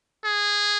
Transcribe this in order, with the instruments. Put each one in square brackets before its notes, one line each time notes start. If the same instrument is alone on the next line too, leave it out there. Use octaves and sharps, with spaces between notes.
[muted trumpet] G#4